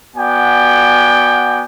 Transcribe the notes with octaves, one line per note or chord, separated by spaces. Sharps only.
B3 F#4 D5 G5 G#5